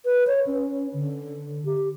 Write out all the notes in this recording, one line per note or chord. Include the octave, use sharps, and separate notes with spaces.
B4
C#5
C#4
D3
G4